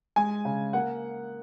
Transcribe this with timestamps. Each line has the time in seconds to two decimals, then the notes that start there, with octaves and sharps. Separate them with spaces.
0.16 G#3 G#5
0.45 C#3
0.73 A#3 F#5